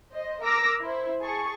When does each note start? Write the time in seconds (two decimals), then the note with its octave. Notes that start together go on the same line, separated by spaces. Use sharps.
0.13 C5 D#5
0.42 A#4 A#5 D6 E6 A#6
0.81 E4 C5
1.21 G#4 G#5 A5 C#6